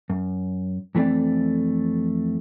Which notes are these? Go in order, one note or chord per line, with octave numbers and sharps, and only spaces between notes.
F#2
F2 E3 A3 C4 D5